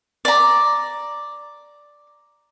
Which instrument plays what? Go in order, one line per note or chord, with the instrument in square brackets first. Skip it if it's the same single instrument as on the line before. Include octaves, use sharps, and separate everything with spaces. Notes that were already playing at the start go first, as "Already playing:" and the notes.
[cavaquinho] D5 A#5